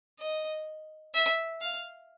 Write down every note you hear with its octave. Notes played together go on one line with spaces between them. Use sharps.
D#5
E5
F5